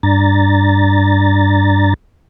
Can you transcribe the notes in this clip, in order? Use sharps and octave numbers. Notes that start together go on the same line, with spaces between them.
G2 D4 A#5 A6